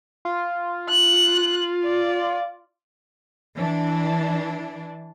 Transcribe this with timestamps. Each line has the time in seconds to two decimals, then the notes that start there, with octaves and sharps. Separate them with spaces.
0.25 F4
0.89 F#6
1.84 D5
3.57 E3 D4